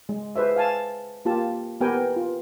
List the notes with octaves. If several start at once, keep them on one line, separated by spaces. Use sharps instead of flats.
G#3
G#4 B4 C5 E5
F5 G#5 A5
A#3 F4 G4 A5
B3 G4 A#4 B4 G5 G#5
F4